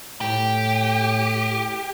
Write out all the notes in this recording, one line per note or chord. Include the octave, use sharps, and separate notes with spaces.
A2 G4